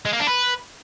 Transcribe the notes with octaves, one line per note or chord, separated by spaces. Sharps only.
G#3
A#3
D4
B4